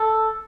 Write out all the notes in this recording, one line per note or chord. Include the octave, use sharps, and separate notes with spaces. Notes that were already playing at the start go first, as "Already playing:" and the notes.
Already playing: A4